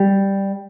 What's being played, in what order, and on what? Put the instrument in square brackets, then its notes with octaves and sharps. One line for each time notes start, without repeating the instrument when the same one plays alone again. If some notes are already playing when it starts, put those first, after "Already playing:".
Already playing: [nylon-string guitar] G3